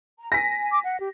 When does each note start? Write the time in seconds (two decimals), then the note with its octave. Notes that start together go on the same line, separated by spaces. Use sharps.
0.19 A#5
0.32 G#5 A#6 B6
0.72 D6
0.84 F#5
1.00 G4